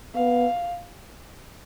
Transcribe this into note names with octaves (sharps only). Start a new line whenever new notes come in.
B3 F5